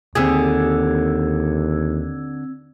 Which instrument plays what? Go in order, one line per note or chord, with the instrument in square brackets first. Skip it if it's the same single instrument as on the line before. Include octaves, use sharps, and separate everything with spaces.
[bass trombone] D#2 [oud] D3 G4 G#4 [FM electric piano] C4 E6 G#6